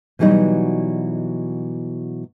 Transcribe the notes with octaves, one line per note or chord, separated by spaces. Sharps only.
B2 E3 F#3 G3 D#4 F#4